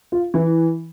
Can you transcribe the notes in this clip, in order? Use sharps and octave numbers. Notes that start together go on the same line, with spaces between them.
F4
E3 E4